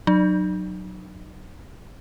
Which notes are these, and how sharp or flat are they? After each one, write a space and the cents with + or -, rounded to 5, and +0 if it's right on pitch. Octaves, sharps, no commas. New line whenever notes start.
F#3 +0 D#4 -40